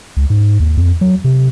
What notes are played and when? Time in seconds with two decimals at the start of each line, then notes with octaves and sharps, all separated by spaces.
0.17 C#2
0.30 G#2
0.60 D#2
0.77 F2
1.01 F#3
1.24 C3